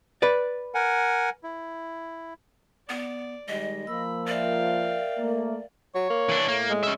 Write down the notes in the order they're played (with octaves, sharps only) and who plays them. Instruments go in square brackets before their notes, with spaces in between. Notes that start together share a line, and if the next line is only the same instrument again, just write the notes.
[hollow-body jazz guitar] B4 D5
[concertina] A#4 F#5 G#5
E4
[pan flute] B3 [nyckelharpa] D5
[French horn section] D#3 G3 G#3 [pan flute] D#5
[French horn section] F3 A#3 [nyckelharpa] B5 [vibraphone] E6
[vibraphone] A#4 E5 [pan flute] D5 [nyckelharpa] F5 G5
[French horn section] A3 A#3
[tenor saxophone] F#3 [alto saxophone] C#5
[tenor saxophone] A#3
[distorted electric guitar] E3 D4
[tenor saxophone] A2 [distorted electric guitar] A#3
[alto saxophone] G#3
[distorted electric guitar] C#4 E5